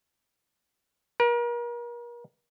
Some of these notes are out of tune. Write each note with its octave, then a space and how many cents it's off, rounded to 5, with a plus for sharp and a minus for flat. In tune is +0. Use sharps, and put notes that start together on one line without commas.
A#4 +40